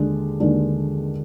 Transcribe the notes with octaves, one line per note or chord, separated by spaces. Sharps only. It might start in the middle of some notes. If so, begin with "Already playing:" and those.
Already playing: D#2 D3 G#3 D4
D#2 D3 G#3 D4